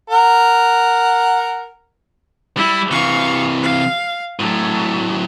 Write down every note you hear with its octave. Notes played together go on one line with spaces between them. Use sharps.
A#4 F#5
G3 E4
C3 E3 F5 C#6
F5
A2 F#3 A3